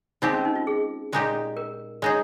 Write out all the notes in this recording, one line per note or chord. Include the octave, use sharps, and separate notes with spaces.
G#3 C4 D#4 G4
C#4
D#4
F4
G#4
A#2 G#3 D#4 G4
A#4
G#3 D#4 G#4 C#5